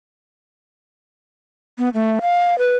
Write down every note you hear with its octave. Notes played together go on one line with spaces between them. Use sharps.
B3
A3
F5
B4